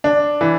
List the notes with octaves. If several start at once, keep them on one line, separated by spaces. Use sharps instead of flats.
D4
E3